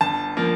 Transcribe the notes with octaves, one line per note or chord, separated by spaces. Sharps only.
G1 A5
F3 A#3